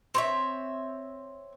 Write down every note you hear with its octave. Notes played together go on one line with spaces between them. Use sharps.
C4 C#5 E5